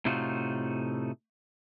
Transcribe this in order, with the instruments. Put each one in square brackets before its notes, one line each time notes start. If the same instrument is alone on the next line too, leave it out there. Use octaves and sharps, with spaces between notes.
[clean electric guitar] A2 C3 A3 D#4 F4 F#4